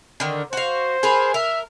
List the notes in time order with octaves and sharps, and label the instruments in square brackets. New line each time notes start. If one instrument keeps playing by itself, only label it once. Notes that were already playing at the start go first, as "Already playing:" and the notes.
[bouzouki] D3 D#3
[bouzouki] F#4 F5 [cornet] C5
[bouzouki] G#4 A#4 B4
[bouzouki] A#4 [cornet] E5